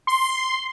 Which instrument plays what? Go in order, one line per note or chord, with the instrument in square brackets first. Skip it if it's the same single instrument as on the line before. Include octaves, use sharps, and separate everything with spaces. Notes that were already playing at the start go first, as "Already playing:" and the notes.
[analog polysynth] C6